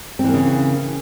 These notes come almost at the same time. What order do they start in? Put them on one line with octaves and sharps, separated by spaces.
C4 E3 A#3 C#3